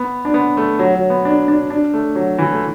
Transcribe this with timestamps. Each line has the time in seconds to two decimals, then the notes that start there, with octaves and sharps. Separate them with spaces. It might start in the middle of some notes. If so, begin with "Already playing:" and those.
Already playing: B3
0.25 D4
0.34 B3
0.57 A3
0.79 F#3
0.95 F#3
1.10 B3
1.25 D4
1.48 D4
1.70 D4
1.94 A3
2.15 F#3
2.38 E3
2.53 A3